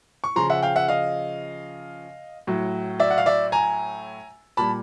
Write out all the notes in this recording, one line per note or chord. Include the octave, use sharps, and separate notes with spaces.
C#6
C#3 F3 A#5 C6
E5 F#5
F5 G5
E5 F#5
D#5 F5
A2 F#3
D5 E5
F#5
F5
D5 E5
G#5 A#5
A#2 G3 A5 B5